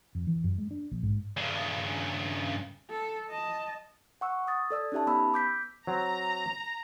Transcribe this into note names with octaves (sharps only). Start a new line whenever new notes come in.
F2
E3
F#2
G#3
D4
A#1
G#2
G2 C#3
A4
D#5 A5
F#5 C#6 E6
D#6 A6
A4 D5 E6
C#4 D#4 G4 E5 A5
B3 B5 E6
D6 G6 B6
F#3 C4 A#5